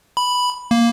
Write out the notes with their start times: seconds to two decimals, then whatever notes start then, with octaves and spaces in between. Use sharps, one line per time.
0.17 B5
0.71 A#3